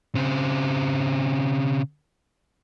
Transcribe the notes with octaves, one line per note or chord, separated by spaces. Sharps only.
C#3 C4